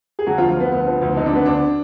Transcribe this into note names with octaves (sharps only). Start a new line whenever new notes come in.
G#4
D3 F#3 F#4
D2 F3 F4
F3 B3
D2 B3
F3
D2
D3 D#4
D4
D3 B3
D2 D4